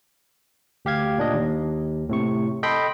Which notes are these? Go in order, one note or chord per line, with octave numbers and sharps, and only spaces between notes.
D2 G4 F5 G#6
A#2 D4 D#5
D#2
A2 C3 C#6
A4 D#5 G5 B5 C6